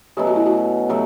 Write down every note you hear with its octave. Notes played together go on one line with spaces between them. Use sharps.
B2 F#3 A3 C#4 G4
F#4
E4
F#4
B2 F#3 A3 G4